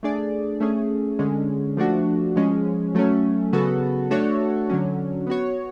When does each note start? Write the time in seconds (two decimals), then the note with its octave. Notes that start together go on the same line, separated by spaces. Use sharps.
0.03 A3 D4 G#4 D5
0.60 A3 C#4 G#4
1.19 D3 G#3 C#4
1.77 F3 A3 D4 F#4
2.36 F3 G#3 C#4
2.95 F#3 A3 C#4
3.53 C#3 F#3 B3 F#4 A4
4.11 A3 D4 F#4 A4 C#5
4.70 D3 F#3 C#4
5.27 B3 F#4 C#5